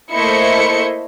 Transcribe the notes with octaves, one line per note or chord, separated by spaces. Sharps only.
A3 A#3 E4 C5 D#5 C#7